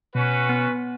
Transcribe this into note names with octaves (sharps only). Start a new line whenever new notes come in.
B2 C#4 F#4 B4
B3